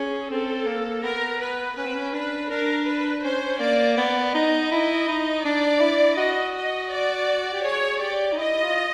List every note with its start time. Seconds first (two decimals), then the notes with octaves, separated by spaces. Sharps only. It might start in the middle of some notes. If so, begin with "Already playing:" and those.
Already playing: C#4 G#4
0.30 C4 A4
0.66 A#3
1.03 B3 A#4
1.40 B4
1.77 C#4 B4
1.85 C4
1.94 C#4
2.13 D4 B4
2.50 D4 A#4
2.87 B4
3.24 C#4 C5
3.60 A#3 D5
3.97 B3 D5
4.34 D#4 D#5
4.71 E4 D#5
5.08 D#4
5.44 D4 D5
5.80 E4
6.17 F#4 D#5
6.55 D#5
6.91 D5
7.54 G4
7.64 G#4 C#5
8.00 G4 D5
8.32 D#4
8.38 E4 D#5
8.62 F4